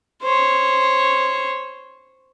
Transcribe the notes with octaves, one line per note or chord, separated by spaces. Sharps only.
C5 C#5